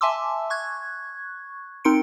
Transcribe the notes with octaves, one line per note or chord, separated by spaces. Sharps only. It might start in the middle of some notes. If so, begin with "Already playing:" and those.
E5 G#5 A5 C6 D6 E6
C#6 F#6 G#6
C4 D#4 A#4 C6 C#7 D7